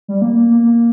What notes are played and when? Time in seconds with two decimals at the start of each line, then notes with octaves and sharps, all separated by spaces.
0.08 G3
0.22 A#3
0.36 A#3
0.50 A#3
0.63 A#3